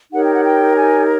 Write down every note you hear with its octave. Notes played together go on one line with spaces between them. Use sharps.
D#4 G4 A#4 C#5 F#5
G5
F#5
G5
G#5